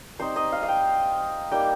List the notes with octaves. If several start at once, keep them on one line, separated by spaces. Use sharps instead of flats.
G3 C4 D#4 C5
D#5
F5
F5
G5
G3 A#3 D#4 G5